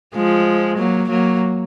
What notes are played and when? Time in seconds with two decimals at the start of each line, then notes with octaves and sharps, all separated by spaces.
0.15 F3 G#3
0.78 F#3 A#3
1.09 F#3 A#3